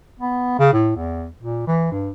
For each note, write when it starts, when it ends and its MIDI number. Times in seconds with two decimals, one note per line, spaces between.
0.20 0.55 59
0.59 0.72 49
0.73 0.93 45
0.97 1.28 40
1.43 1.64 46
1.67 1.91 52
1.92 2.11 43